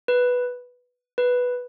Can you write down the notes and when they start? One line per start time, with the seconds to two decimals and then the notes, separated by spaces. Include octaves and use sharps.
0.08 B4
1.18 B4